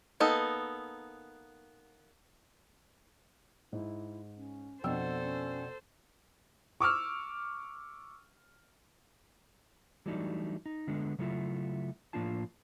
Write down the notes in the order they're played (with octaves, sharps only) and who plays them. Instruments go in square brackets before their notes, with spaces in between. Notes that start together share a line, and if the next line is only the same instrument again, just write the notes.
[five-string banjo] A#3 B3 D#4 A4
[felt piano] G#2 [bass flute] E4
[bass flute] C#4
[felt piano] F2 G5 E6 [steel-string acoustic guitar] B2 D4 [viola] A4 C5 [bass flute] F#5
[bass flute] C#4
[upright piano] C#6 D6 E6 F6
[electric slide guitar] E3 F#3 G3 A3 D4 D#4
D#4
D3 G#3 B3 D4 A4
C#3 F#3 A3 E4 F4
A2 F3 A#3 D4 F4 A5